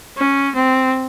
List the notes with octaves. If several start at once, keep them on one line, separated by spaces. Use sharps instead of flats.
C#4
C4